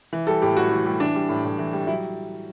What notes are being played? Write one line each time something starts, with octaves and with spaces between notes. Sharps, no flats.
E3
G3 A4
A2 G4
A2 F#4
E3
G3
E3 D4
G3
A2
A2
E3
G3
F#3 E4